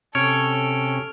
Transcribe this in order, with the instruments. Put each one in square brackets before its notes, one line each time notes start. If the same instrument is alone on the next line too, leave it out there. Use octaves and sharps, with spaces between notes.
[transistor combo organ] C3 C#4 [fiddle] A4 [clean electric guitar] C#5 [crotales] F6 D7 F7